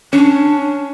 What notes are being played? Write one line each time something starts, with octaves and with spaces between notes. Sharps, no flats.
C#4 D4